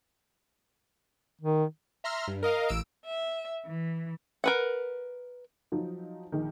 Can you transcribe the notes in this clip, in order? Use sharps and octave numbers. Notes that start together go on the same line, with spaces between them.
D#3
E5 A#5 C6 F6
G2
A#4 D#5 F5
A1 E6 D7
E5
E3
A#4 B4 F#5
F3 F#3 D#4
A#1 D#3